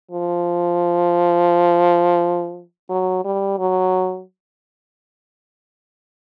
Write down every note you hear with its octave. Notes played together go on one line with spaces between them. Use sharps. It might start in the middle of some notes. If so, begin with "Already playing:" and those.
F3
F#3
G3
F#3